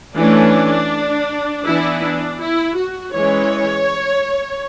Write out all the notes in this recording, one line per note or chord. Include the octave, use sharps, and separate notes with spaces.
E3 A3 C#4 D4
E3 B3 D4 E4
D4
E4
F#4
E3 G#3 C#4 C#5